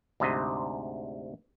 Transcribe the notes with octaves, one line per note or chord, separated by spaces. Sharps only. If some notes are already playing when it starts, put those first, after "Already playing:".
D2 G#2 C3 D#5